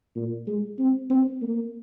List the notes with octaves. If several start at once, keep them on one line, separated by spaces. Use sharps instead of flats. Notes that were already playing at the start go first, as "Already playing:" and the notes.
A#2
G#3
C4
C4
A#3